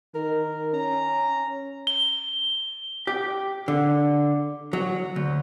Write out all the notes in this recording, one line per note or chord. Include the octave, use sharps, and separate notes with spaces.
D#3 A#4
C#4 A#5
G7
G4
D3
F#3
D2